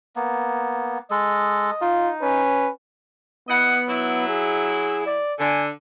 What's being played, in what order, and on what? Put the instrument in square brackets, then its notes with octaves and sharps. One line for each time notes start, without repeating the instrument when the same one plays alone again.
[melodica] A#3 B3
[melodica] G#3 A4 [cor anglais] D#5
[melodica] D#4 [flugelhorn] F4
[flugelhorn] C#4 [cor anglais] B4
[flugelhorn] B3 [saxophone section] E4 D#5 F#5
[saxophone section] F#3 E4
[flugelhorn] G#4
D5
[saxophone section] D3 [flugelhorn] G#5